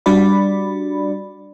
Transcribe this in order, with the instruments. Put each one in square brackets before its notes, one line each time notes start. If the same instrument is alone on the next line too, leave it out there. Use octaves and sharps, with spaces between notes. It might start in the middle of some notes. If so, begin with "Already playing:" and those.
[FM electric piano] G3 D4 F#4 D5 B5